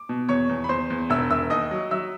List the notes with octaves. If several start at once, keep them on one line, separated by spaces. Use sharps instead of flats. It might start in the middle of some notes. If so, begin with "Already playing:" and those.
Already playing: D6
B2
E2 C#5 C#6
E2
B5
E2 C5 C6
E2
E1 E5 E6
E1 E5 E6
D#2 D#5 D#6
F#3
F#3 E5 E6